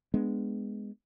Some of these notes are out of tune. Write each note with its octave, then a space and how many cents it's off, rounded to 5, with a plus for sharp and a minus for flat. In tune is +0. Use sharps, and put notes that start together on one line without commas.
G#3 +0 B3 +0 D4 +15